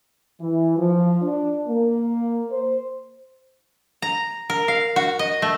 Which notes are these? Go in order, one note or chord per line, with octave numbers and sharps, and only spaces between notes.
E3
F3
D4
A#3
C5
A#5
A#4
F5
F#4
D#5
A3